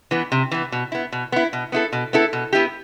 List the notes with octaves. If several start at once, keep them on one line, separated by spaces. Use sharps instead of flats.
E3 B3
C3
E3 B3
B2
B3 E4
B2
B3 E4
B2
B3 E4 A4
B2
B3 E4 A4
B2
B3 E4 G4